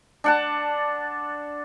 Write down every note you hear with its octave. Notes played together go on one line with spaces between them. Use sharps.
D4 F#5 A5